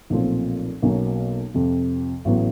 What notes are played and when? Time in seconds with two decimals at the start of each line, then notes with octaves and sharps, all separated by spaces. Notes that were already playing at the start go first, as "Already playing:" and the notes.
0.10 B1 A#2 F3 A3 C4
0.82 B1 B2 F#3 A#3 C#4
1.54 F2 C3 F3
2.25 A1 A2 F#3 B3